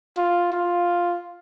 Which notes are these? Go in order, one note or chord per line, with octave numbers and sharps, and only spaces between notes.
F4
F4